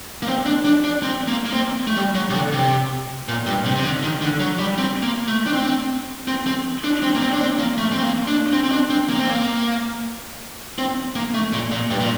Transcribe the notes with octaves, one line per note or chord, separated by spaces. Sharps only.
A#3
C4
D4
D4
D4
C4
A#3
A#3
C4
A3
G3
F#3
C3
D3
C3
A#2
G2
C3
C3
D3
D#3
D3
F#3
G3
C4
A#3
A3
D4
C4
C4
C4
D4
C4
A#3
C4
D4
C4
A#3
A3
C4
A#3
D4
C4
C4
D4
C4
A#3
C4
A#3
C4
A#3
A3
A#2
A#2
G2
A#2